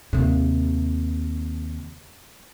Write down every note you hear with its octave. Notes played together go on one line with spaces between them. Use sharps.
D#2 C3